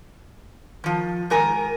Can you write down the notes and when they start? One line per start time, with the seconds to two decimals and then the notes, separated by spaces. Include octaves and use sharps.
0.84 D#3 F3
1.30 G#2 D#3 A#4 G#5